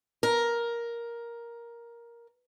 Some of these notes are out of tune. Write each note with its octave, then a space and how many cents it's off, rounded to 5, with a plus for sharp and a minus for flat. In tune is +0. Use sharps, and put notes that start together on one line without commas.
A#4 +10